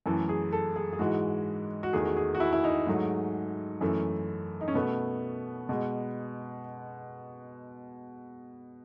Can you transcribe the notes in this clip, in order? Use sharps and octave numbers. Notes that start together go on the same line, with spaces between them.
F#2 E3 A3 A4
G#4
A4
G#4
G#4
G#2 E3 G#3 F#4
F#4
E2 D#3 A3 G#4
F#4
G#4
F#4
E4
E4
D#4
G#2 F#3 A3
F#2 E3 A3
D#4
C#4
B2 A3 B3
B2 G#3